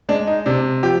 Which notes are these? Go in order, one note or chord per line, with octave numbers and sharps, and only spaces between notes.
G#3 D4
D#4
C3 D4
F3 G4